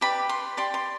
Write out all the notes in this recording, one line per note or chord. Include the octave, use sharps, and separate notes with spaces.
G4 B4 D5 B5
C6
G4 D5 C6
C6